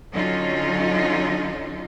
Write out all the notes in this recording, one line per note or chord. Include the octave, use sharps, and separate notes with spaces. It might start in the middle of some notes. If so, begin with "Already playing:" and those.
D3 F#3 C#4 D#4 F4